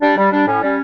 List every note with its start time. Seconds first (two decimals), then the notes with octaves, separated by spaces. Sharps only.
0.01 G3 D4
0.17 G3
0.32 G3 D4
0.47 A2 C#4
0.62 G3 C#4